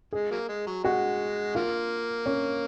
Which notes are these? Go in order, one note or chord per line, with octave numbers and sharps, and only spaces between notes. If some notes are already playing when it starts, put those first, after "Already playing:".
G#3 G#4
F#3 A#3
G#3
F#3
G#3 F#4
F#3 A#3 F4
C#4